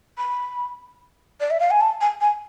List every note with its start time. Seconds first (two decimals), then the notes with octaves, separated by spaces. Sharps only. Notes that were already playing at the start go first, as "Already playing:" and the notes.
0.18 B5
1.40 D5
1.51 E5
1.60 F5
1.71 G#5
1.81 A5
2.01 G#5
2.21 G#5